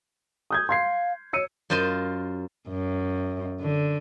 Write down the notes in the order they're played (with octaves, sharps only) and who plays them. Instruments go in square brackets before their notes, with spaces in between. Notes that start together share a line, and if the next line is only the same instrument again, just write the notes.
[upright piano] D#6 G6 G#6
[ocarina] F5 [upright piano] C6 G#6 C7
[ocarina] C#5 [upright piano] E6 C#7 D#7
[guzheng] F#2 F4 C5 D#5 C6
[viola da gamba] F#2
D3